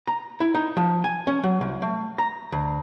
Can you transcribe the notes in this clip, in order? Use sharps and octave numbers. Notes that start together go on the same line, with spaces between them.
A#5
E4
D#4
F3
G#5
C#4
F#3
C2
A3
A#5
D2